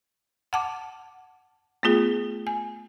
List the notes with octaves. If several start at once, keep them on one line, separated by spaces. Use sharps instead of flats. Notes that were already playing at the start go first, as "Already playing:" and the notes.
F#5 A5 D6
A3 B3 F4 G#4
G#5